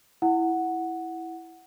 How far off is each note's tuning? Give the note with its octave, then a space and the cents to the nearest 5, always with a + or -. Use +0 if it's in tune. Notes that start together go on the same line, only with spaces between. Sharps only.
E4 +0 F#5 +0